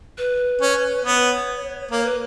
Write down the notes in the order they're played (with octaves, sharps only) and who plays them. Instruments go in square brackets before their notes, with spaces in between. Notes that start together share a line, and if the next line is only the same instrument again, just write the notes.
[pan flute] B4
[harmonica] C#4
[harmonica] B3 [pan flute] C#5
[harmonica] A#3 [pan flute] C#5
[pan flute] B4